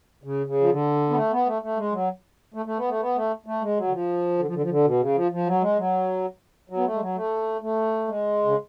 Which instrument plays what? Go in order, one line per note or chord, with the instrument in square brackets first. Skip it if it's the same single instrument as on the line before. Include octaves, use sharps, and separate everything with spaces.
[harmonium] C#3
C#3
F3
D3
B3
A3
B3
A3
A3
G#3
F#3
A3
A3
B3
A3
B3
A3
A3
G#3
F#3
D3
F3
D3
F3
D3
F3
D3
B2
C#3
F3
F3
F#3
G#3
F#3
F#3
B3
A3
G#3
F#3
A3
A3
G#3
C#3